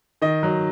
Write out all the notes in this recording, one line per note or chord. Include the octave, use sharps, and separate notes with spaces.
D#3 D#5
F#3